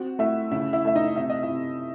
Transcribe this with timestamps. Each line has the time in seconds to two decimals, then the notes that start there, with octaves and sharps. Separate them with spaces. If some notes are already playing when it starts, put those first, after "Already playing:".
Already playing: C4 F#4 F#5
0.19 A3 E4 E5
0.51 C#3 E4 E5
0.73 E4 E5
0.85 A3 E5
0.95 D#4 D#5
1.16 C3 E5
1.30 D#5
1.43 E4 E5
1.50 C3